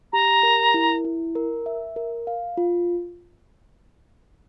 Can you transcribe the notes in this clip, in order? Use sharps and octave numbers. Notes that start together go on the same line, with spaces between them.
G4 A#5
A#4
E4
E4
A#4
E5
A#4
F5
F4